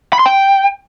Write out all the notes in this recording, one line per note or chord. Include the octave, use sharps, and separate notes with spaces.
B5
C6
G5